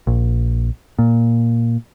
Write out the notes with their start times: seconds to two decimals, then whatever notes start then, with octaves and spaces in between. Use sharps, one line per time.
0.07 A#1
0.99 A#2